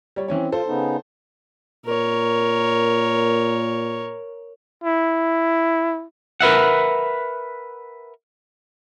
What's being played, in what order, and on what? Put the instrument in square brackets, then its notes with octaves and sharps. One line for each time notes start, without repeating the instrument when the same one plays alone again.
[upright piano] G3 C#5
[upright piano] E3 C#4 C#5 [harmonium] C4
[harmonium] F4 [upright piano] A4 C5
[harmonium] C#3 B3 D#4
[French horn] A#2 [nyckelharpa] A#4 C#5
[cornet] E4
[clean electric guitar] A#4 B4 E5 F#5